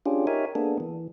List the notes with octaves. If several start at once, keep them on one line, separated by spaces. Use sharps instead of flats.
C#4 D4 F4 G4 G#4
D#4 G4 A#4 C#5 E5 G#5
A#3 B3 D4 G#4 A4
E3